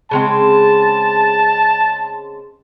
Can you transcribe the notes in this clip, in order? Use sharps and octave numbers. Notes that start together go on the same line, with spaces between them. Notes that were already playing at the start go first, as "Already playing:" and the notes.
C#3 G#3 C4 A5